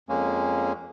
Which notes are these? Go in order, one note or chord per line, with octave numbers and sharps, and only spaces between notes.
F2 G#3 A#3 C#4